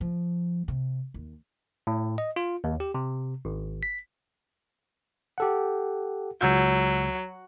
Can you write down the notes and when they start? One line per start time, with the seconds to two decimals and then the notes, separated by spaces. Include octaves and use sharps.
0.01 F3
0.68 C3
1.14 D#2
1.87 A2
2.18 D#5
2.36 F4
2.64 D#2
2.80 G4
2.94 C3
3.45 G#1
3.83 B6
5.38 G4 A4 F#5
6.41 C#2 F#3 E6 G6